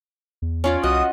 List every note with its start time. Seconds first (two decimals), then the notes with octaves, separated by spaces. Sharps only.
0.42 E2
0.64 C#4 F4 C#5 D5
0.84 C2 F#4 D#5 D#6